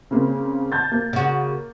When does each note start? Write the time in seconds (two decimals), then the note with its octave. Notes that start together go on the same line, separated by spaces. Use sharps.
0.11 C#3 A#3 C4
0.72 A5 G6 A6
0.92 A#3
1.13 C#3 F#4